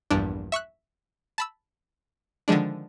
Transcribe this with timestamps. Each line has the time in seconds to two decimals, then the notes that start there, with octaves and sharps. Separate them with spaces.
0.11 A#1 E2 G2 D4
0.52 E5 C#6 E6 F#6
1.38 A5 B5 E6
2.48 D3 D#3 F3 G#3 D4